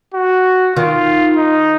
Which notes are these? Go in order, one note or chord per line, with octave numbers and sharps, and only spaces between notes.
F#4
D#3 F4
D#4